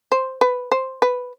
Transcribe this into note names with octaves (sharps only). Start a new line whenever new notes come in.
C5
B4
C5
B4